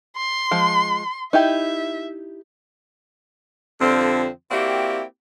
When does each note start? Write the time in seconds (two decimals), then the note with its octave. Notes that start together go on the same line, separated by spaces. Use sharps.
0.17 C6
0.51 F3 G#3
1.33 D#4 E4 G4 E5
3.80 F2 D3 F3 G3 C4
4.50 A#3 C4 E4 F#4 G4 D5